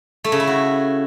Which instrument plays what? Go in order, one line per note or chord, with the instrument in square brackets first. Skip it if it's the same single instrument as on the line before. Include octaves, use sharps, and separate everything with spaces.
[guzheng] A3
C#3
E4
F#4